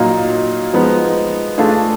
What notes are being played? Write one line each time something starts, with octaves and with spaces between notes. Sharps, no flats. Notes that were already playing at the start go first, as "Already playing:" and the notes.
Already playing: A#2 F#3 A#3 D#4
F3 G#3 B3 D#4
A3 D4 F4 G#4